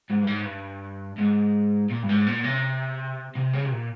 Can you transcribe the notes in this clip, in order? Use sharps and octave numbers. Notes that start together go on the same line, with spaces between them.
G#2
G2
G#2
G2
G#2
A#2
G2
G#2
A#2
C3
C3
C#3
C3
A#2